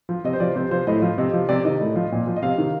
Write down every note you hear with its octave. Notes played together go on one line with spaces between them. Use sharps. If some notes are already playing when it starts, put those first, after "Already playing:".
F3
C3 D#5
C5
F3 D5
C3 C5
F3 C5
A2 D#5
F3
C3 D#5
F3
C3 D5
D#3 D#5
A2
F3
A#2
F3
D#5
C3 F5
D#3